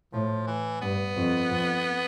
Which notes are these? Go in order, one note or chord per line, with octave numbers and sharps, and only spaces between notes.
A2 F3
E3
G2 B3
F2
F2